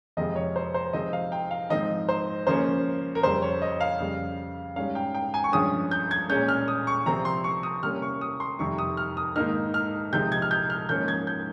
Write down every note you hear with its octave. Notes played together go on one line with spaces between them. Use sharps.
F2 C3 F3 G#3 C4 D#5
C#5
C5
C5
C3 F3 G#3 C4 D#4 D#5
F5
G5
F5
G#2 F3 C4 D#4 D#5
C5
C#3 F3 A#3 C#4 C5
A#4
F2 C#3 G3 C5
C#5
D#5
F5
F2 C#3 G3
G#2 G3 C#4 F5
G5
G5
G#5
C#6
G2 F3 G#3 C#4 D#6
G6
G#6
A#2 G#3 C#4 G6
F6
D#6
C#6
C3 F3 C4 A#5
C6
C#6
D#6
C3 G3 A#3 C#4 F6
C#6
D#6
C6
F2 C3 D#3 G3 C#6
D#6
F6
D#6
G#2 D#3 A#3 D#4 F6
F6
C3 F3 G#3 D#4 G6
G#6
F6
G6
F6
G#2 F3 A#3 C#4 G6
G#6
G6